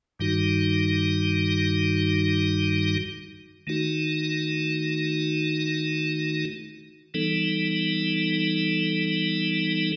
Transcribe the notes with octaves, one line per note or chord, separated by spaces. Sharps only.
G2 D#3 G3 D#4 F#4
D#3 A3 D#4 F#4
E3 G3 B3 D#4 A4